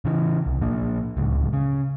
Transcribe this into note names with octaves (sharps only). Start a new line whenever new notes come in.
C#3 E3
C2
A#2 A#3 D4
D1 C#2
C#3